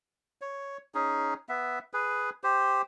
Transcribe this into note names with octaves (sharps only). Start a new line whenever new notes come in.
C#5
C#4 D#4 G#4
B3 E5
G#4 B4
G4 C5